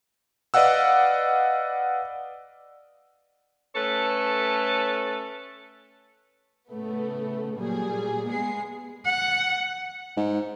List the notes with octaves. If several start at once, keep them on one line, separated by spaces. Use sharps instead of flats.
B4 D5 D#5 F5 F#5 E6
A3 C#4 A4 B4 C#5
A2 C#3 A3 B3
A#2 F#3 G3 G#4
G#3 B3 G#4 C7
F#5
G#2